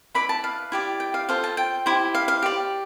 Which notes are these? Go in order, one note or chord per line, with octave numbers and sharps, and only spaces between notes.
E4 B4 D5 B5
A5
F5
E4 G4 D5
G5
F5
F4 A4 C5 F5
A5
G5
E4 G4 C5
F5
F5
G4 D5